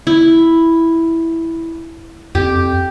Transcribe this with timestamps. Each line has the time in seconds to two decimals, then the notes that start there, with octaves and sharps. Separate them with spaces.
0.07 E4
2.35 F2 G4